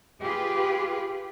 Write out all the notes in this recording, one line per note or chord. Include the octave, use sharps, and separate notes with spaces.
F4 G4 G#4 B4